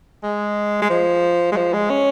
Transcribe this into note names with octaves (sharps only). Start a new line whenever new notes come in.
G#3
G#3
F3
G#3
F3
G#3
C#4